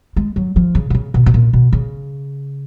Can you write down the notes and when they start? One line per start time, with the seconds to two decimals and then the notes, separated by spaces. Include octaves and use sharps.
0.16 G#3
0.36 F#3
0.56 F3
0.75 C#3
0.90 B2
0.95 C#3
1.14 B2
1.26 B2
1.34 A#2
1.53 B2
1.73 C#3